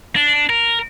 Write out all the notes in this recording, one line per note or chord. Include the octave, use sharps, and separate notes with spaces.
D4
A#4